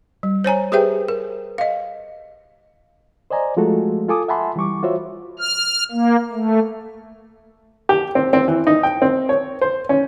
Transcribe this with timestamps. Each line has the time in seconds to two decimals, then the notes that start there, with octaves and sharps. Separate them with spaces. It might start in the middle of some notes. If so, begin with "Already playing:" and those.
0.23 G3
0.44 C5 C#5 G#5 A#5
0.72 G4 G#4 B4 C5 E5 G5
1.08 A#4
1.58 D#5 F5
3.30 C5 D5 D#5 G#5 A#5
3.57 F3 G#3 A3 F4 F#4 A4
4.09 F4 A4 G#5 D6 D#6
4.28 E5 F#5 G#5 A5 B5 C6
4.56 E3 G3 C#6 D6
4.83 F4 F#4 C5 C#5 E5
5.39 F6
5.91 A#3
6.33 A3
7.89 G4
8.15 C4
8.33 C4
8.48 E3
8.67 D#4
8.83 G5
9.02 C4
9.29 C#5
9.61 C5
9.89 C#4